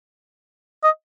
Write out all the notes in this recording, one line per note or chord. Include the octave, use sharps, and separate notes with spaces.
D#5